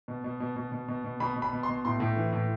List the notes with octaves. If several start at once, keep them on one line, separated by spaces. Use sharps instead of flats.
B2
B2
B2
B2
B2
B2
B2
B2 B5
B2
B5
B2
C6
B2
A2 C6
A2
E3
A2